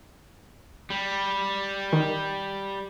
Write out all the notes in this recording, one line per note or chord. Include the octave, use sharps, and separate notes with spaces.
G3
D#3